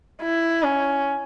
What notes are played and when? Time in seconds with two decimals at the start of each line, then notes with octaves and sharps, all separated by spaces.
0.21 E4
0.63 C#4